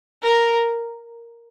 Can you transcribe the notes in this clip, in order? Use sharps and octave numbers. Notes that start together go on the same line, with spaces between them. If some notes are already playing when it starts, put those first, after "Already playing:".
A#4